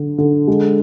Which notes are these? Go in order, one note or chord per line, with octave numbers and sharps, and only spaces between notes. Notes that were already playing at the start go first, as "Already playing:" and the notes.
Already playing: D3
D3
G#3